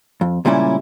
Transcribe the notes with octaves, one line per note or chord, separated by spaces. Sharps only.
F2
C#2 A#2 G3 C#4 E4